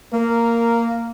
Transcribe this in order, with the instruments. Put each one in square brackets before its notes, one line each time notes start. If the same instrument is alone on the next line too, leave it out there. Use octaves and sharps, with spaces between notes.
[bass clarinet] A#3 [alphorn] A#4